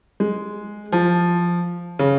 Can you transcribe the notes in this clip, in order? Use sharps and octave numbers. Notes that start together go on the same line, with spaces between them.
G#3
F3
C#3